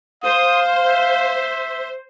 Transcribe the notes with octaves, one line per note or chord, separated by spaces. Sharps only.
C5 F5 D#6
E5